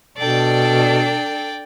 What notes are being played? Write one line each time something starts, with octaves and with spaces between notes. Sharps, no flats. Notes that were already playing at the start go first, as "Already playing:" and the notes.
B2 D4 A4 D5 G5